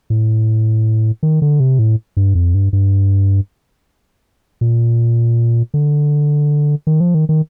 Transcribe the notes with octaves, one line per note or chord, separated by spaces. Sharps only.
A2
D#3
D3
C3
A2
G2
F2
G2
G2
A#2
D3
D#3
F3
D#3
D#3